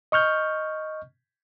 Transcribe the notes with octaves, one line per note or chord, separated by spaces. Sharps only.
D#5 C#6 F6 G6